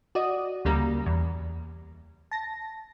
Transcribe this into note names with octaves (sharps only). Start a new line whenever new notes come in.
F#4 D5 D#5 D#6
D2 C#3 G3 A#3 A#5
E2
A5 A#6